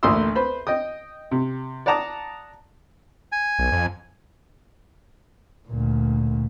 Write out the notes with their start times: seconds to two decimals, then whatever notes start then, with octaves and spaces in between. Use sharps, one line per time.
0.03 A1 D2 A#3 C6 D#6 E6
0.36 B4 C5 B5
0.67 D#5 G5 D#6
1.31 C3
1.86 D5 F#5 A5 A#5 D6 D#6
3.32 G#5
3.59 B1
3.72 F2
5.69 D2 A#2